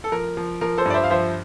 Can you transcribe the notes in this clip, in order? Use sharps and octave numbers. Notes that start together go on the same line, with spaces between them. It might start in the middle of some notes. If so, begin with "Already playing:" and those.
A4
F3 A#4
F3
F3 A#4
A4 C5
G2 D5
C5 E5
F5
F3 C5 E5